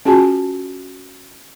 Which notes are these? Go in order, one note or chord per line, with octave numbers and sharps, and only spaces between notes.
C#4 F4 F#4 G#4 G#5 A5